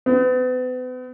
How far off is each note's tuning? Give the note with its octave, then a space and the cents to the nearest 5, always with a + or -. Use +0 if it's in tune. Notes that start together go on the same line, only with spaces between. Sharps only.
B3 +40